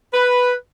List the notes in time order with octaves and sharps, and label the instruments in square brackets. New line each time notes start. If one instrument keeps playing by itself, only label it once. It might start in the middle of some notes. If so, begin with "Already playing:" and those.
[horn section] B4